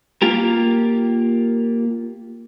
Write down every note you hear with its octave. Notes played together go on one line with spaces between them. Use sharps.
A#3 F4 G4 A#4